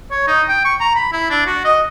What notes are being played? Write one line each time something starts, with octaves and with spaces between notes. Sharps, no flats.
C#5
D#4
G5
C#6
A#5
B5
E4
D4
F#4
D#5